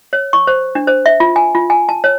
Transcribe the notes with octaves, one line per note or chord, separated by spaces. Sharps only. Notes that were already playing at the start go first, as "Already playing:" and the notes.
C#5
C#6
C5
D4
C5
E5
F4
G#5
F4
G#5
A5
C#5